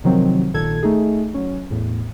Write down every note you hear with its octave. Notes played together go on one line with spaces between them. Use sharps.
C3 D#3 F3 F#3 C4
A#1 A#2 D#3 A4 G#6
A3 D#4 G#4
F#3 C#4
E2 A2